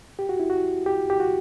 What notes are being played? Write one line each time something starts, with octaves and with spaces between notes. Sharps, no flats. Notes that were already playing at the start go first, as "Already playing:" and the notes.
G4
F#4
E4
F#4
G4
G4
F#4